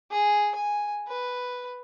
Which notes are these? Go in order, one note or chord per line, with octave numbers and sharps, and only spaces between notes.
G#4
G#5
B4